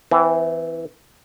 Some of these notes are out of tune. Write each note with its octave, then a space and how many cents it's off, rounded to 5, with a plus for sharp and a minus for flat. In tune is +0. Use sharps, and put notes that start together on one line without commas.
E3 +0 C4 -35